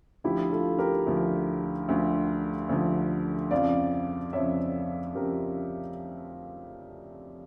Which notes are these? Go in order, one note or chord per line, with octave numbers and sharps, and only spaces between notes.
D2 D3 F3 E4 G4
F4 A4
G4 A#4
D2 D3 F3
D2 D3 F3
D2 D3 F3
F2 C#3 F3 D5 F5
F2 C#3 F3 C#5 E5
F2 C#3 F3 G4 A#4